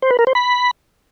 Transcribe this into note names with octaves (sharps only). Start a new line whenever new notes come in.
C5
B4
A#4
C5
B5